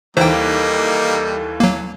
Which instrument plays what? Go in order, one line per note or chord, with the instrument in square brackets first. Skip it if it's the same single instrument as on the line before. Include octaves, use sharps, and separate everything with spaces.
[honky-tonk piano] D#2 E3 [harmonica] G3 A#3 D#4 [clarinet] A4 [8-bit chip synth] C5 G5
[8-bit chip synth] F#3 A#3